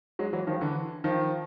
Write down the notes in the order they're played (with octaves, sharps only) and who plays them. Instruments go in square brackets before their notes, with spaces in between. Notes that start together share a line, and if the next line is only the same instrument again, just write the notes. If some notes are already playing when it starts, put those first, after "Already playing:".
[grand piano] F#3 G#3
E3 F#3
D#3 F3
D3 E3
D#3 F3